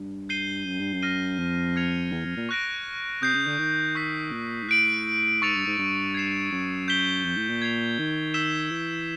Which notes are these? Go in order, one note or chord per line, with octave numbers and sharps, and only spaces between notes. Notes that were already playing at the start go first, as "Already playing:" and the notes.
Already playing: G2
G6 C7 D#7 G7
F#2
G2
F#2
F6 A#6 D#7 G7
F2
F6 G#6 C#7 F7
E2
F2
A#2
C#6 F#6 A#6 D7
C3 D#6 G6 C7
C#3
D3
D#3
C#6 E6 G6 B6
A#2
G#2
A2 F#6 B6 D7 F#7
G#2 C#6 E6 A6 C#7 F7
G2
G#2
G2
G#6 C7 E7
F#2
G6 B6 E7 G7
F2
A2
A#2
G#6 C7 F7
D#3
E6 G6 B6 E7 G7
E3